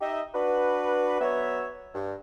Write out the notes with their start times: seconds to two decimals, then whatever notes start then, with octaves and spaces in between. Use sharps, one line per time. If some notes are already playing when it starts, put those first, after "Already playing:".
0.01 D#4 G4 D#5 E5
0.34 D4 F#4 B4
1.21 F#3 B3 C#5 E5
1.94 G2